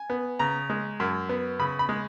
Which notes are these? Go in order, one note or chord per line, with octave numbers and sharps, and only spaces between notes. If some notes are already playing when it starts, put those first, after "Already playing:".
Already playing: G#5
B3
C#3 A#5
G#3
F#2
B3
C#3 B5
B5
G#3